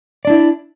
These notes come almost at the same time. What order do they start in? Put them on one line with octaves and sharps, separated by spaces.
D5 D4 E4